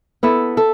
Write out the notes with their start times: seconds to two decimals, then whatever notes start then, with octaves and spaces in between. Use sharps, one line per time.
0.23 B3 E4 A4 E5
0.57 A4 E5